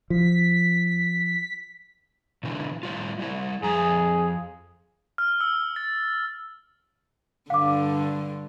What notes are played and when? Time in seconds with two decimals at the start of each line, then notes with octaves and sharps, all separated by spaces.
0.10 F3 B6
2.43 B2 D3 E3
2.83 A2 G3 F4
3.19 G3 E4
3.63 F2 G#4 A#5
5.18 F6
5.41 E6
5.76 A6
7.50 G2 D3 F5 D6